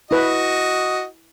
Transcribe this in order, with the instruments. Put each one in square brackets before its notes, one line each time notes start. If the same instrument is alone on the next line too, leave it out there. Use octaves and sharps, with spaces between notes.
[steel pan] E4 B4 [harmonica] F#4 D#5